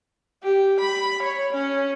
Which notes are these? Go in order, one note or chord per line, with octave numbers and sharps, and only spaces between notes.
G4
B5
C#5
C#4